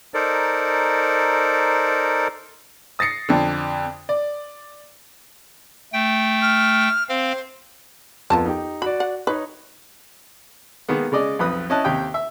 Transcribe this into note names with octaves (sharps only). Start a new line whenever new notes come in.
D#4 A4 A#4 C5 D5
D#6 A6 A#6 C7 C#7
F2 D3
D5
A3 G5
F6
C4 C5 F5
F2 B3 F4 A#4 A5
D#4 G4
F#4 D5 B5
F#5
D#4 B4 C#5
D#3 G#3 A#3 B3
C#3 G#3 D5 D#5
B1 F2 B4 D#6
C#4 E4 D#5 A5 F#6
D#2 C3 G4 G5 D#6
E5